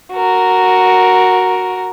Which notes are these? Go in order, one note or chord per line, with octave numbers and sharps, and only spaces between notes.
F#4 A#4